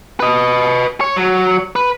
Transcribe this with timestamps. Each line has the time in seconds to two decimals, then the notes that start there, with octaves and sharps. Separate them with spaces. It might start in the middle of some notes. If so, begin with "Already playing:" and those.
0.20 B4 D#5
1.01 C#5
1.17 F#3
1.76 B4